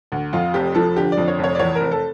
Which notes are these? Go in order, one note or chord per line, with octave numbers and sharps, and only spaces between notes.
D2
F2 F4
F1 G4
F3 A4
D3 G4
D5
F2
C#5
F1
C#5
D5
E2 C#5
A#4
F1
A4